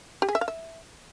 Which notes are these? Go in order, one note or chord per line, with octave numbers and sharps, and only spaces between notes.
G4
G#4
E5
F5
E5